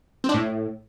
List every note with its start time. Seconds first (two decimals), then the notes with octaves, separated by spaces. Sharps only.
0.24 C4
0.29 D4
0.34 A2